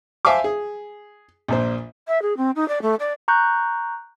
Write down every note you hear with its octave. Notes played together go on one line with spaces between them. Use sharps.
C5 E5 F5 G#5 A5 D6
G#4
A#1 A#2 C5
E5
G#4
C4
D#4
D5
A3
D5
A#5 C#6 F#6 G6